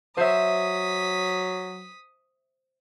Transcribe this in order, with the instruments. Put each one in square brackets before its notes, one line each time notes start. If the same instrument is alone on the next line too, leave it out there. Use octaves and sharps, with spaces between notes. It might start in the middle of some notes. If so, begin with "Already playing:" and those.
[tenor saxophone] F#3 [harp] C5 E5 [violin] D#6 B6